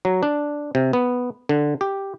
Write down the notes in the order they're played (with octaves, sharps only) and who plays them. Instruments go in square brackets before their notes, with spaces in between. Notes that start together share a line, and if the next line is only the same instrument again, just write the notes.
[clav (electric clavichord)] F#3
D4
C3
B3
D3
G4